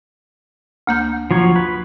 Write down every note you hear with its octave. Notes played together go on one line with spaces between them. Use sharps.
D2 A#3 G6
F3 F#3 C#5
B4